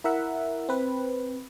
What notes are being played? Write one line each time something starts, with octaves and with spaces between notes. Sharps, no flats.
E4 A#4 E5 F#5
C4 B4